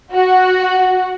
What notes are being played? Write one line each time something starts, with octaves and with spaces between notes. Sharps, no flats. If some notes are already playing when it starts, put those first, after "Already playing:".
F#4